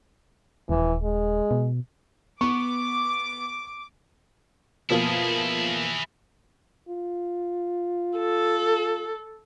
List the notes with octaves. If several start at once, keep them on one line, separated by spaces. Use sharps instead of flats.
D#1 E3
G#3
B2
B3 C#6 D6
B2 F3 A#3 E4 G#4
F4
A4